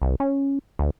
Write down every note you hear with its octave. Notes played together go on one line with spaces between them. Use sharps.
C2
C#4
D2